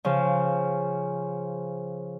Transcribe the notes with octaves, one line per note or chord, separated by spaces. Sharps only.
C#3 F3